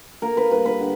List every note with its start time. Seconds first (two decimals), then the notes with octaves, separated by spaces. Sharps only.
0.22 A#3 A#4
0.37 B4
0.51 G3 B4
0.65 B4
0.80 D3